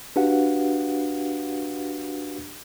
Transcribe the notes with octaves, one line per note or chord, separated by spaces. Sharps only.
D4 F#4 G4 B4 F5 F#5